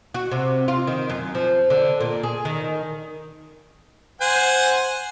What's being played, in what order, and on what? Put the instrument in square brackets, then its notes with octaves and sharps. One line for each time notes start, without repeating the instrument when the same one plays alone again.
[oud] F#4
C3
F4
D#3
F#2
F3
D3
A#2
G#4
D#3
[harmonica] C5 F#5 G#5